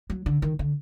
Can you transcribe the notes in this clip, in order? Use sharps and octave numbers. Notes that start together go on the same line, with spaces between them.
F#3
D3
D#3
D3